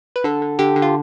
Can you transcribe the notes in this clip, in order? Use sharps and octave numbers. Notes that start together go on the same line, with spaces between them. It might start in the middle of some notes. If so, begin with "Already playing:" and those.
B4
D3 A4
D3
D3 G4
D3
F4